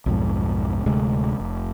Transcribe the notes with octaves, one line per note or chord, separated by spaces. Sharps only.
B1 F2 G#2
D1 D2 C3 G#3
F1